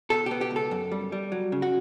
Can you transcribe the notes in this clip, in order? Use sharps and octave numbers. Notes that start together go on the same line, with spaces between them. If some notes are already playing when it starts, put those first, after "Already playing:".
B2 A4
B3 G4
G4
C#2
A4
F#2
G3
G3
F#3
C#3
F#4